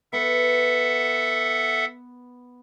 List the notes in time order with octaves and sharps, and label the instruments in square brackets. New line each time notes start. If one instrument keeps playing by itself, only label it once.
[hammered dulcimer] B3 [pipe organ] A4 E5 F#5